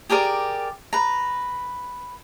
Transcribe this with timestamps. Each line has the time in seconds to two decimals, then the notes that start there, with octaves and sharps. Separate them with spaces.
0.09 G4 G#4 A#4 D5
0.93 B4 A#5